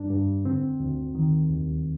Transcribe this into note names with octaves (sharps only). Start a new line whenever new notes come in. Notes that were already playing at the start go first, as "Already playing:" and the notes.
Already playing: G2 G3 D4
G2
D3 C4
D2
D#3
D#2